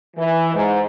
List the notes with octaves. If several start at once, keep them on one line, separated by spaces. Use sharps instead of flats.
E3
G#2